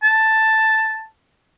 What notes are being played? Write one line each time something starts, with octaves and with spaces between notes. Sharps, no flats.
A5